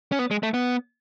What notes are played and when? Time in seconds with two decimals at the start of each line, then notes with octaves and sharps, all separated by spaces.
0.12 C#4
0.19 B3
0.31 G#3
0.43 A3
0.54 B3